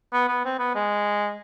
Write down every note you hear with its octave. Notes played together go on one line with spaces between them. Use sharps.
B3
B3
C4
B3
G#3